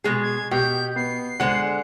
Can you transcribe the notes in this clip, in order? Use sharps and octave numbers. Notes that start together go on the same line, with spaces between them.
B2 G#3 G#4
G#6
B2 G4 G6
B3 C7
D3 G#3 C5 F#5